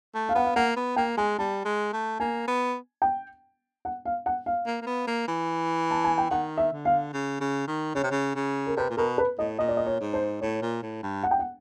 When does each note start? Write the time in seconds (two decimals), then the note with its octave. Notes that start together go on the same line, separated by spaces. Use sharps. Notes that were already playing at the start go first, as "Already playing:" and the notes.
0.15 A3
0.29 F5
0.35 B3 F#5
0.44 F5
0.56 A#3 F#5
0.76 B3
0.96 A#3 G5
1.17 G#3 G#5
1.38 G3 A5
1.65 G#3
1.93 A3
2.20 A#3 G#5
2.48 B3
3.02 G5
3.85 F#5
4.05 F5
4.26 F#5
4.46 F5
4.67 A#3
4.82 A#3
4.87 B3
5.07 A#3
5.28 E3
5.91 A5
6.04 G#5
6.18 G5
6.31 D#3 F#5
6.57 E5
6.72 D3
6.85 F5
7.13 C#3
7.40 C#3
7.68 D#3
7.95 C#3 C#5
8.03 C3
8.11 C#3
8.36 C#3
8.67 A#4
8.77 C3 B4
8.90 A#2
8.97 B2 A#4
9.18 B4
9.39 A2 D#5
9.59 A#2 D#5
9.68 D5
9.77 D#5
9.86 C#5
10.00 G#2
10.14 C5
10.41 A2 C#5
10.62 A#2
10.83 A2
11.03 G2
11.23 F#5
11.31 G5
11.39 F#5